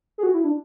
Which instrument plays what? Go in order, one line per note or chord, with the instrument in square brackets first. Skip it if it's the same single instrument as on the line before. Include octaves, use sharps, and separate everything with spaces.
[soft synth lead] G#4
F#4
E4
D4